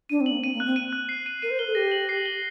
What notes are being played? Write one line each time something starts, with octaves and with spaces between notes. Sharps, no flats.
D4 D#7
C4
F#7
A#3
C4 D#7
A#3
F#6
C4
D#7
F#6
C7
D#7
A#4 D#7
C5
A#4 G7
A4
G4 A#6
F#7
C7
G7